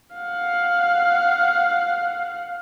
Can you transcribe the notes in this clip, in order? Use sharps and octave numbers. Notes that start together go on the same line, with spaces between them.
F5 F#5